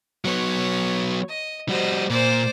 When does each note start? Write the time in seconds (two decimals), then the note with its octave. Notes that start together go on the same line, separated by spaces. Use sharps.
0.25 F#3 B3 C#5
1.29 D#5
1.69 G3 F#4 C5 D#5
2.10 A#2 C5 D5